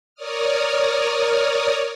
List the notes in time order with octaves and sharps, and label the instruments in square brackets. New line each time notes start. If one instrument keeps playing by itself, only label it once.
[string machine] A#4 C#5 D5 D#6 F6